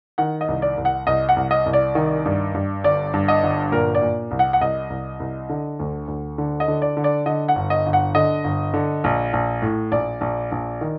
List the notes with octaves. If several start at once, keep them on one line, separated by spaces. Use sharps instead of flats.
D#3 F#5
D#5
C2
D5
C2
F#5
C2 D#5
F#5
C2
D#5
C2
D5
D#3
G2
G2
G1 D5
G2
D#5
G1
A#2 A#4
D5
A#2
C2
F#5
F#5
C2 D#5
C2
C2
D3
D2
D2
D3
D#5
D3
D5
D3
D5
D3 D#5
F#5
G1
D#5
G1
F#5
D3 D#5
G1
D3
A#1
A#1
A2
A#1 D5
A#1
A#1
D#3